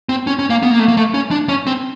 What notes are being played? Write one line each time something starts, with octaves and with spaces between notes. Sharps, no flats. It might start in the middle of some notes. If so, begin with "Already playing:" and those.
C4
C#4
C#4
A#3
B3
A#3
A3
A#3
A3
C#4
D4
C#4
C4